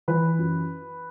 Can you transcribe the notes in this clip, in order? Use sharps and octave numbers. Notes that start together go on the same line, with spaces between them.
E3 B4
F#2